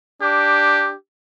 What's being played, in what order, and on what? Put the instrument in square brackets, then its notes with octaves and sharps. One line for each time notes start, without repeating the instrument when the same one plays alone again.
[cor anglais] D4 [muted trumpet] G4